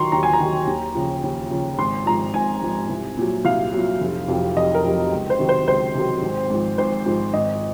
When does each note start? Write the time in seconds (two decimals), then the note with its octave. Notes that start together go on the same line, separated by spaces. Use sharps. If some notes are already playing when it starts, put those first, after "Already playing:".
Already playing: D#3 F#3 A#5 C6 C#6
0.12 D#2 A#5
0.23 G#5
0.33 A#5
0.40 D#3 F#3
0.67 D#2
0.95 C#3 F3
1.23 D#2
1.50 C#3 F3
1.78 G#1 C6
2.06 G#2 F3 A#5
2.34 G#1 G#5
2.62 G#2 F3
2.90 C2
3.18 A#2 F#3
3.45 C2 F5
3.73 A#2 F#3
4.01 F1
4.28 F2 C3 F#3
4.56 F1 D#5
4.74 A#4
4.84 F2 C3 F#3
5.11 C#2
5.30 C5
5.39 C3 D#3 F#3
5.49 C5
5.67 C#2 C5
5.94 C3 D#3 F#3
6.22 G#1
6.50 G#2 F3
6.78 G#1 C5
7.06 G#2 F3
7.34 G#1 D#5